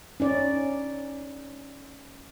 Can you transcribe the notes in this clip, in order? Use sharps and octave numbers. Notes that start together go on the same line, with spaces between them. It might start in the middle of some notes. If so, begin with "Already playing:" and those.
C#4 D#4 D5